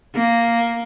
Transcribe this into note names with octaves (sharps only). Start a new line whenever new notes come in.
A#3